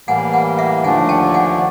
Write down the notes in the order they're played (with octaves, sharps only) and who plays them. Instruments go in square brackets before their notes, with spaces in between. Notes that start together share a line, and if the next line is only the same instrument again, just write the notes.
[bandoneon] A2 E3 G3 A#3 [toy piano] F#5 G#5
[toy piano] F#5 G#5
E5 F#5
[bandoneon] D#2 D3 F3 A3 D4 [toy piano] F#5 G#5
[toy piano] G5 A5
F#5 G#5